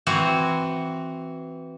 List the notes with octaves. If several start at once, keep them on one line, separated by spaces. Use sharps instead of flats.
E3 C4 F#4